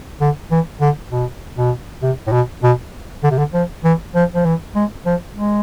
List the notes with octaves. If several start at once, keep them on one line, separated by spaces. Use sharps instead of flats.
D3
E3
D3
B2
B2
C3
A2
B2
B2
D3
C3
D3
F3
E3
F3
F3
E3
G#3
F3
G#3